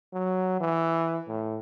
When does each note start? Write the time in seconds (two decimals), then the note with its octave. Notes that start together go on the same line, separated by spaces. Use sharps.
0.13 F#3
0.60 E3
1.28 A2